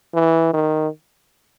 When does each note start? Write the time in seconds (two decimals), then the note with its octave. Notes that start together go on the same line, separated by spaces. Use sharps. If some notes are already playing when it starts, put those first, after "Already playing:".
0.15 E3
0.53 D#3